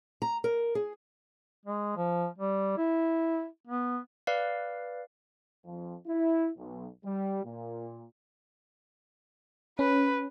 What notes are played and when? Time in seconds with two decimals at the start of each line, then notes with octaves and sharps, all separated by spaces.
0.22 A#5
0.44 A#4
0.75 G#4
1.65 G#3
1.97 F3
2.38 G3
2.78 E4
3.67 B3
4.27 B4 D5 F5
5.65 F2
6.07 E4
6.58 B1
7.05 G3
7.45 A#2
9.79 C#4 B4